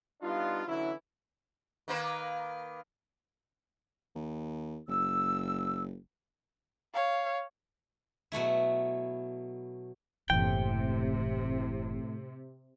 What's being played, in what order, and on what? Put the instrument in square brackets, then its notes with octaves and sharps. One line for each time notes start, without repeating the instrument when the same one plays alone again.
[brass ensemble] G3 B3 D4 D#4 F4
D3 E3 F#3 C#4 E4
[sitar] D#3 A#3 B4
[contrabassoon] D#2
[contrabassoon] F#1 [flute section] E6
[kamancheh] C#5 F5
[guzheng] B2 F#3 A3 E4
[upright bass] F#1 E3 [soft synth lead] A2 [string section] C3 [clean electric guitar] G5